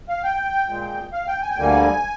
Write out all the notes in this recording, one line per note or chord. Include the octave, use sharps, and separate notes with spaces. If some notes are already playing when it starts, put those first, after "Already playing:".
F5
G5
A#2 G#3
F5
G5
G#5
G5
D2 D3 G3 A#3 G#5